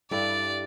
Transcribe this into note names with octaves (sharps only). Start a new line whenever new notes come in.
G2 G3 E4 A4 D5